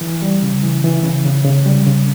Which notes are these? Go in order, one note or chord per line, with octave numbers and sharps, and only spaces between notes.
E3
G3
C#3
E3
E3
C#3
C#3
C#3
G3
C#3